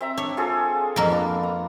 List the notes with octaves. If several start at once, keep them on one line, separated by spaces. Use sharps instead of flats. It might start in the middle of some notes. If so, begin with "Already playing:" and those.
C4 E5 A#5
D4 C#5
F4 G#4 A4
F2 A#3 A#4
B3 D4 A4
A#5